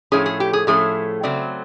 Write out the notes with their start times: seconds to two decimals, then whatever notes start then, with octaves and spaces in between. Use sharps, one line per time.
0.12 A2 F3 A3 C#4 G#4
0.26 G#4
0.40 G4
0.53 G#4
0.67 A2 F3 A3 C#4 G#4
1.23 C#3 F#3 A3 C4 D5